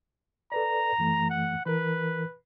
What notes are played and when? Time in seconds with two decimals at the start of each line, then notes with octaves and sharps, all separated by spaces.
0.52 A4 B4 D5 A#5
0.98 F#2 E3 A3
1.30 F#5
1.66 E3 A#4 B4